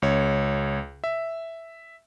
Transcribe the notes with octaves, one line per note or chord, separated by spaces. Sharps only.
C#2 C#5
E5